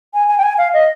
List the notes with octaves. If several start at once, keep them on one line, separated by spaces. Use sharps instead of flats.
G#5
G#5
G5
G#5
F5
D#5